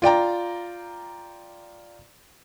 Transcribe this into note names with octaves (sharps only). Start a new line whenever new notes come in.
F4 D5 G5 A#5